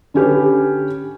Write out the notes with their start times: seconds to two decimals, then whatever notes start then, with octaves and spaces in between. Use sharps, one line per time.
0.14 D3 C#4 G4 B4